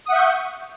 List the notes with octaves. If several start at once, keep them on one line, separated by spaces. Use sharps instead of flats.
E5 F#5 C#6 D#6 G6